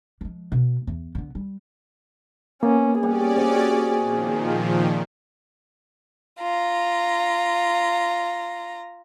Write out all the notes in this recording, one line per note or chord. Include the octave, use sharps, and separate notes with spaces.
F3 G#3
B2
E2
D3 B3
G3
A#3 B3 C#4
G3 C#4 G#4 D5 F#5
C3 F#4 G4
A#2 D#3 F3
F4 A#5